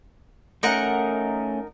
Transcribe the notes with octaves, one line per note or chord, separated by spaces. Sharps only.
A3 C#4 D#4 A#4 F#5